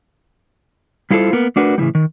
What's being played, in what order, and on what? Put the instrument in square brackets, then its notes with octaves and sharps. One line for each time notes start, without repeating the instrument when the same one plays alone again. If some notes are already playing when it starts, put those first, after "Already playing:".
[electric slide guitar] G3 E4 F4 G#4 A4 C5
A#3 B3 A#4
A3 D4 F#4 A#4 B4
A2 C#3 E3 G3
D#3